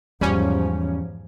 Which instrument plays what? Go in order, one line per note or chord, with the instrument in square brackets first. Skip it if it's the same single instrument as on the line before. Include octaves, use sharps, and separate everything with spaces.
[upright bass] E2 [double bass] G#2 F3 [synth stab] G3 C#4